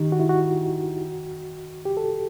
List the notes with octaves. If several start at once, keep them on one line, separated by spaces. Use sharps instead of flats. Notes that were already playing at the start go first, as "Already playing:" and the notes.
Already playing: D#3 D#4 G4
F#4
E4
F#4
G4
A4